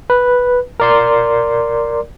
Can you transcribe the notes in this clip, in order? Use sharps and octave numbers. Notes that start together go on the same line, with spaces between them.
B4
A#4 D5 C6